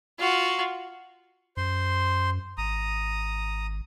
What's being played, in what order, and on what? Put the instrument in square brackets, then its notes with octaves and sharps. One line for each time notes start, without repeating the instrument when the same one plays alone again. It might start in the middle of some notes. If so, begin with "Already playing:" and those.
[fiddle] F4 F#4
[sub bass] F#2 [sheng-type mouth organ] C5 C6
[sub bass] G#1 [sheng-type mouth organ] A#5 D#6